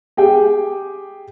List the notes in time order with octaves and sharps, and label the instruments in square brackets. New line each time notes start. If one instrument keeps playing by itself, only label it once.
[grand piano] G4 G#4 G5